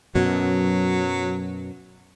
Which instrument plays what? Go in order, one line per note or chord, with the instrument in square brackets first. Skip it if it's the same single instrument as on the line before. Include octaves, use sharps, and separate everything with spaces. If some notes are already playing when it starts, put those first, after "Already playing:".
[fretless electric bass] F#2 B2 [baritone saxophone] F#3